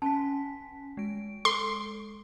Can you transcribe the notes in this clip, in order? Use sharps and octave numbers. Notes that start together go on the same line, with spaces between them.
C#4 G#5 A5 B6
G#3 D7
A4 C6